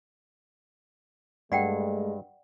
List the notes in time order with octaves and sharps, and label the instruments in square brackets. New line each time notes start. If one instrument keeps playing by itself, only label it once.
[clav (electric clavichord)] G2 [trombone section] G#3 A3 [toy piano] D5 F#5 G5